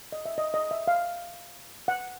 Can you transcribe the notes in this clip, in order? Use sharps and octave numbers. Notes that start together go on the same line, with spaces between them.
D#5
E5
D#5
D#5
E5
F5
F#5